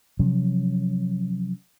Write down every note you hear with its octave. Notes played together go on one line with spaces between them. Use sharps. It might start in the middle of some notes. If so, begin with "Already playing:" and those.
C3 F3 F#3 C#4